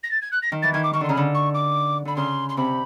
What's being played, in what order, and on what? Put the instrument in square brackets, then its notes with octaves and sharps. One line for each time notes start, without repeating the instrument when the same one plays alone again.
[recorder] A#6
A6
G#6
F#6
A#6
[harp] D#3
[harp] E3 [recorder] A6
[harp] D#3 [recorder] G#6
[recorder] D6
[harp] D#3 [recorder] C#6
[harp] D3 [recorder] C6
[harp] C#3 [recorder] A#5 B5
[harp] D3
[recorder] C#6
D6
[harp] D3 [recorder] B5
[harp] C#3 [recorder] C6
[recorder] C6
[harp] C3 [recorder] B5